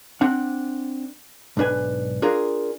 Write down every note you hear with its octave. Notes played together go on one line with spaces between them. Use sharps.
C4 D4 F#5
B1 G#2 D4 B4 G#5
D4 F4 G#4 A#4